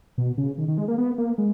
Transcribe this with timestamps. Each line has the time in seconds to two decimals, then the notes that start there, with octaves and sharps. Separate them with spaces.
0.18 B2
0.38 C#3
0.58 D#3
0.68 D#3
0.78 G#3
0.88 A#3
0.98 B3
1.18 A#3
1.38 G#3